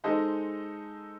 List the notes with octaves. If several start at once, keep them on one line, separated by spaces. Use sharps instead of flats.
G#3 D#4 A4 C5 D#5